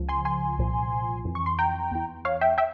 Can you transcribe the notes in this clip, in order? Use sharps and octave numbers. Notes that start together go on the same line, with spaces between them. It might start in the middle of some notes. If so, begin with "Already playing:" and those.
Already playing: C#2 C#3 F3
G#5 C6
G#5 C6
C2 A#2 F3
F2 E3
C#6
C6
G5 A#5
E2 E3
C#5 F5
E5 G5
E5 G5